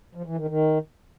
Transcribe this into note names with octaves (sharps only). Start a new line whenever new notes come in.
F3
E3
D#3
D#3